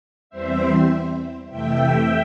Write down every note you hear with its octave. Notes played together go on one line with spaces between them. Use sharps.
E2 E3 G3 C4 C5 E5
F2 C3 E3 A3 E5 G5